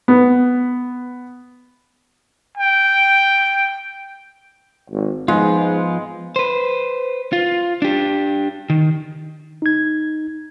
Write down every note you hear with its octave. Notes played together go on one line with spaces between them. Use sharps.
B3
G5
G#1
G#2 F3 G#3 B3 F4
B4 C5
F4
D4 G4
D#3
D#4 G#6